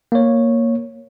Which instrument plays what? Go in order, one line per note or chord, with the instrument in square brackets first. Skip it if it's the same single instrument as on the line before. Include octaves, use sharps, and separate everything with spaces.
[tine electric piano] A#3 C#5